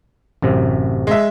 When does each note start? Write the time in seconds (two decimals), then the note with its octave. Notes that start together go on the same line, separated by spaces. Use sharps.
0.42 A1 F#2 C3
1.07 G#3 E5